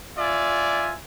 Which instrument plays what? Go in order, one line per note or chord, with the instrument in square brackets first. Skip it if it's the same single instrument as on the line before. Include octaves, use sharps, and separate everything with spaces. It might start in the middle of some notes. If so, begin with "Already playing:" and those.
[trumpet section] F4 D5 E5 G#5